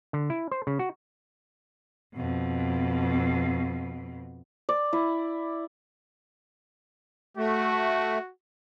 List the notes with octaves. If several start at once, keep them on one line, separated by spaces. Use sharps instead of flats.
D3
E4
C5
C#3
F#4
F2 B2
D5
E4
A3 F#4